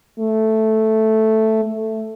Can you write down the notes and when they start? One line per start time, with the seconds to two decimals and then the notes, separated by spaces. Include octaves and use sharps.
0.19 A3
1.64 A3